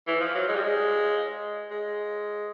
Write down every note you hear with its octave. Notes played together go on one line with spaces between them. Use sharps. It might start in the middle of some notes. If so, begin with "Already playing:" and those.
E3
F3
F#3
G#3
G3
G#3
G#3